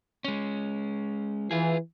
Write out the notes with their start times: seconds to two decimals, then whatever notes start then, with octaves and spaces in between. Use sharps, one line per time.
0.25 G#3 C#4
1.51 E3 F4 G#4